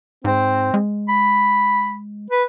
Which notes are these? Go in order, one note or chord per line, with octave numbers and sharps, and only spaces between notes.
G#2 C4
G#3
B5
B4